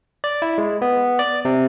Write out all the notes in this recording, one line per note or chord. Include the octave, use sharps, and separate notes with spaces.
D5
E4
G#3
B3
D5
C3